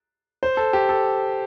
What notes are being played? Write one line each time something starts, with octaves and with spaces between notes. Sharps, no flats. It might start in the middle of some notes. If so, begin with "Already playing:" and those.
C5
A4
G4
A4